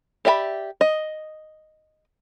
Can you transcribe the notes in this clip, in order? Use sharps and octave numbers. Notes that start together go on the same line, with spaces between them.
G4 D5 E5 G5 B5
D#5